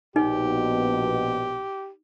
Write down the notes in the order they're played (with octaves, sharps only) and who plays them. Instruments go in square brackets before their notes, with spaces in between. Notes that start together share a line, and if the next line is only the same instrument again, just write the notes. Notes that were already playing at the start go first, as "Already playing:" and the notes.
[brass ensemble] A#1 B2 [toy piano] D#4 [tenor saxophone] G4